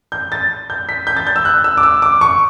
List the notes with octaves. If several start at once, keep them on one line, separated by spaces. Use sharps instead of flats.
G6
A6
G6
B6
G6
A6
G6
E6
F#6
E6
D6
E6
D6
C#6